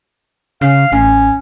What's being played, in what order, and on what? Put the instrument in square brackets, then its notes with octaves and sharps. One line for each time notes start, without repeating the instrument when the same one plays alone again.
[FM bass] C#3 [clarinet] F5
[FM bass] A1 [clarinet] C#4